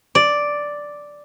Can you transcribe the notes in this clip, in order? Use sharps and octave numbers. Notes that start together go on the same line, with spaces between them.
D5